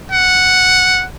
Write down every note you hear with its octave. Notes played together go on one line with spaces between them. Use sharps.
F#5